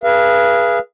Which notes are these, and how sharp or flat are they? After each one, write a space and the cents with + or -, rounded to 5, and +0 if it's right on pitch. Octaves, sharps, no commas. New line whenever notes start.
G#4 +0 B4 -30 F5 -35